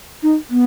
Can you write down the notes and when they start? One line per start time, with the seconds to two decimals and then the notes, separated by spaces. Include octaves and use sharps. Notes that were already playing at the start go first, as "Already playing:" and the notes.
0.23 D#4
0.50 B3